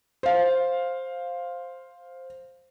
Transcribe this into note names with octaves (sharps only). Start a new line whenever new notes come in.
C5 F5